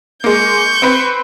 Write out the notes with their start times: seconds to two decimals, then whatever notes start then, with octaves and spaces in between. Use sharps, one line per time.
0.24 G#3 A#3 C#6 G6
0.82 C4 B4